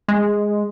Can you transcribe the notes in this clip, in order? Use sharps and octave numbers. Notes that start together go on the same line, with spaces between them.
G#3